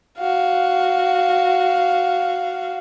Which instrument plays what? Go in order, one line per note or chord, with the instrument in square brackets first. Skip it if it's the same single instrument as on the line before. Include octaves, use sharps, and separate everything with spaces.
[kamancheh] F#4 F5